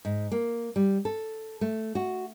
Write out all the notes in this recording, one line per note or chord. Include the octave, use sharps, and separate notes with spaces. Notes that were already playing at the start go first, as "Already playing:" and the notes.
G#2
A#3
G3
A4
A3
F#4